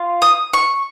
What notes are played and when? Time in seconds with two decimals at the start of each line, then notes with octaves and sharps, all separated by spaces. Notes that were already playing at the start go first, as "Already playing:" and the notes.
Already playing: F4
0.22 D#6
0.53 C#6